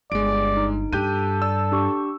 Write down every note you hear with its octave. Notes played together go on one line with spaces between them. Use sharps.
G1 G#3 D5 D7
D#4
G2 G4 A4 F#6 G6 D#7
D5 E6
D4 G4 C#6